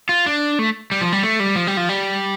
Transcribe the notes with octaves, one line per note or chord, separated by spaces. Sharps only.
F4
D4
A3
G3
F3
G3
A3
G3
F3
G3
F3
G3